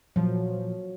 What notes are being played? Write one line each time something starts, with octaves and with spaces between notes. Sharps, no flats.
A#2 F3 F#3